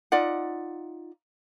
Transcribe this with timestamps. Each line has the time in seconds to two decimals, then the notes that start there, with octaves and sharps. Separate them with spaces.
0.12 D#4 F4 D5 F#5